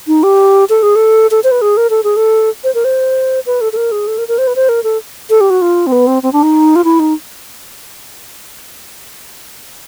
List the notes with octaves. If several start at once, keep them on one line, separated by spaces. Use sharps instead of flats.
D#4
G4
A4
G#4
A4
A4
C5
B4
G#4
A#4
A4
G#4
A4
C5
A#4
C5
B4
A4
A4
A#4
G#4
A4
A#4
A#4
C5
B4
C5
A#4
A4
A4
G4
F#4
F4
C4
B3
C4
C4
D4
D#4
F4
E4
D#4